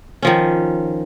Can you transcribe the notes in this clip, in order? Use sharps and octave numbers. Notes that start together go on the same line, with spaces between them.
D#3 F3 C#4